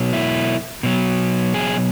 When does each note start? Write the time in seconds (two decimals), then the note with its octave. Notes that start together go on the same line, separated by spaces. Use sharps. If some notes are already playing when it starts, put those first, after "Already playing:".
Already playing: B2 F#3
0.13 E4
0.83 B2 F#3
1.54 G#4